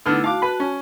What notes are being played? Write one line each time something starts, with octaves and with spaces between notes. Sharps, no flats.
D3 A3 B3 D#4 E4 F6
F#4 F5 A5 D6
B4 B5
C#4